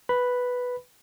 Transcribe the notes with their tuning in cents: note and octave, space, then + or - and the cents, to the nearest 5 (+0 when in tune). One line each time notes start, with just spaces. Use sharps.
B4 +0 B5 +0